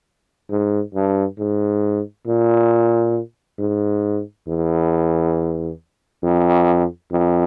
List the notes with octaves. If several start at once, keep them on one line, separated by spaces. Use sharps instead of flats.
G#2
G2
G#2
A#2
G#2
E2
F2
F2